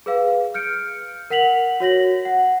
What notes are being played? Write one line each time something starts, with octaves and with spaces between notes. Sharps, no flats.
G#4 B4 F5
F6 G6 C#7 D7
A#4 F#5 B6 F7 F#7
F#4 C#5 A#6 F#7
F#5